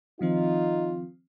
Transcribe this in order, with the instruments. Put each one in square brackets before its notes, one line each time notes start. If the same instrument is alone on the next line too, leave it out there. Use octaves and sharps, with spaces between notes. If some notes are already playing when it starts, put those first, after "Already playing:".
[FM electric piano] D#3 F3 C4 [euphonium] D#4 [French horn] F4